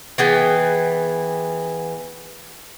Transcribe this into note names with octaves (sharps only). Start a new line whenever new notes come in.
E3 B3 G#4 G5